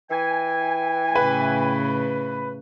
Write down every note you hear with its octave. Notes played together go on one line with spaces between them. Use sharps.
E3 G5 G#5
A2 C#3 B4